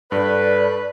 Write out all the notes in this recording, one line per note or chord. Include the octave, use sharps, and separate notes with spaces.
G2 A4 B4 D5